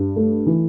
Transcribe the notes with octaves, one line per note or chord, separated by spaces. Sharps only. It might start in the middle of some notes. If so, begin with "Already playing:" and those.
Already playing: G2
A3
E3